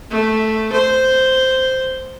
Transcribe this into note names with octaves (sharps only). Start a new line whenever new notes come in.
A3
C5